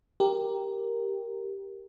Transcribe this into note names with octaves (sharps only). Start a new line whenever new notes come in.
G4 A#4